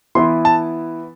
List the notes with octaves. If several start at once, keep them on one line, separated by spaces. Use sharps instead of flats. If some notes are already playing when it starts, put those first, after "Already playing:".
E3 B3 E4 C6
A5